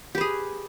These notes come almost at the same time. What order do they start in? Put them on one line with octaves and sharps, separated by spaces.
G4 B4 G#4